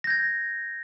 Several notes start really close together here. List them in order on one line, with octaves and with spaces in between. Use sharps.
A#6 G6 G#6